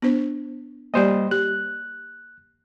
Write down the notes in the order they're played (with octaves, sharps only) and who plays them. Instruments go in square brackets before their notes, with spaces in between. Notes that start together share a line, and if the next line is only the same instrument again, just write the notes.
[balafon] B3 D4 C5
[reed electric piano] G3 C5 D#5 [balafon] A#3 D5
[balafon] G4 [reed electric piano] F#6